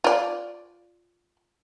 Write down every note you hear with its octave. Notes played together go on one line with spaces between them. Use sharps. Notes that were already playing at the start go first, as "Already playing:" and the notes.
F4 D5